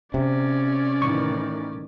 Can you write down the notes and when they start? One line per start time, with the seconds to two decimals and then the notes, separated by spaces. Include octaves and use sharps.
0.14 C3 C#4 D5
1.02 A2 D#3 E3 C#6